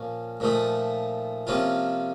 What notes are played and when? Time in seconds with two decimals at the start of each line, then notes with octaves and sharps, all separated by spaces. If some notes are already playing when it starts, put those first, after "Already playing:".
Already playing: A#2 F3 A#3 C#4
0.40 A#2 F3 A3 D#4
1.47 C3 F3 A#3 C#4 F4